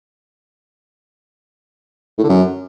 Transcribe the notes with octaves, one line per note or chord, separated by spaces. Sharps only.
A2
D3
F#2